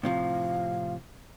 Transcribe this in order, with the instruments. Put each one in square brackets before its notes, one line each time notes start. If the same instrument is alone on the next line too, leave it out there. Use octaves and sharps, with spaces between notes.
[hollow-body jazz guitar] A2 C3 F3 [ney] F5